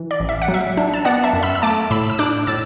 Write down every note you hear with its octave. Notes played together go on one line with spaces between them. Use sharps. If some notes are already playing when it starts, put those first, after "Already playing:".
Already playing: E3
D5
A1
E5
F#5
F#3
E5
D4
A5
B3 D5 F#5
E5 A5
F#2
B5 E6
E6
A3 A5 D6
A2 B5 E6
E6
D4 D6 F#6
A2 E6 A6